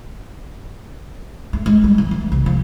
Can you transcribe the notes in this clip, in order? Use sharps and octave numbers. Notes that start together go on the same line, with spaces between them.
A3
G#3
G3
E3
A3
C2
F3